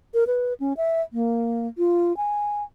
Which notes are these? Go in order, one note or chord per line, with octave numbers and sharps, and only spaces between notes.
A#4
B4
C#4
E5
A#3
F4
G#5